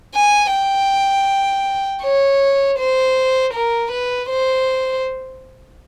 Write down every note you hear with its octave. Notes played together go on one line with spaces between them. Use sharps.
G#5
G5
C#5
C5
A#4
B4
C5